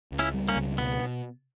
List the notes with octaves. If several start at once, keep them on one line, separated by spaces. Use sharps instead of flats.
C#2
C#4 E4
G3
A#3 C#4
C#2
B2 B3